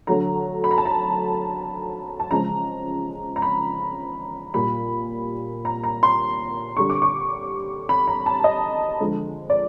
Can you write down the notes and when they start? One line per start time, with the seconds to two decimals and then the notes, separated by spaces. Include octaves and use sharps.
0.07 D3 F#3 A3 A#5
0.64 B5
0.71 A#5
0.78 A5
0.86 A#5
2.20 A5
2.31 C#3 F3 G#3 A#5
3.36 A#5
3.42 B5
4.54 A#2 G3 B5
5.65 A#5
5.84 A#5
6.03 C6
6.77 D3 G3 C#6
6.90 D6
7.02 C#6
7.89 B5
8.07 A#5
8.26 A5
8.44 D#5
9.00 D3 F3 G#3
9.50 D5